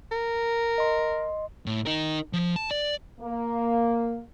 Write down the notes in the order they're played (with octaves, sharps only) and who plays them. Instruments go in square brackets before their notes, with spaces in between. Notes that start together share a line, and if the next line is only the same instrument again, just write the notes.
[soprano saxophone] A#4
[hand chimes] D#5 C6
[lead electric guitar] A2
D#4 A#4
F3
A5
D5
[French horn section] A#3